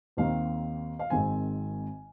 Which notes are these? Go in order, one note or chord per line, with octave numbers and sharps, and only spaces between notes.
D#2 D#3 C4 D#4 F5
F5
G#1 G#2 D#3 C4 G#5